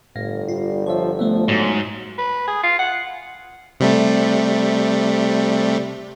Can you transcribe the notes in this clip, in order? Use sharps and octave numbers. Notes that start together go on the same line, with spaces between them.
G1 A2 F5 A#6
G3 F4
F3 C#5 E5
F3 A3 B3 E5
G#2 F#3
B4
G#4
F4
F#5
C3 G3 A3